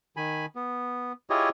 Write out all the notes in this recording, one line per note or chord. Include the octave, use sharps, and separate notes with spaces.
D#3 G#5 B5
B3
E4 F4 G4 G#4 C#5 D#5